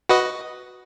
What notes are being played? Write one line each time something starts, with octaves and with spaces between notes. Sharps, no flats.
F#4 B4 D#5